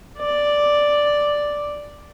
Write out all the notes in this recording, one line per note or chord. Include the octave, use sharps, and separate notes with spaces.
D5